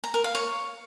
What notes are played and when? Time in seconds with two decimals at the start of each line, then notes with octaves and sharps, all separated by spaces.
0.04 A#5
0.14 A#4
0.24 F5
0.35 C#5